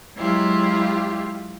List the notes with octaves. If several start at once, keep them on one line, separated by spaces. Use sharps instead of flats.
F#3 G#3 E4 F4 G4